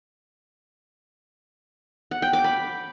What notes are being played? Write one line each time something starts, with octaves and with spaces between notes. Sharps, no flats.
F#5
G5
D6
B5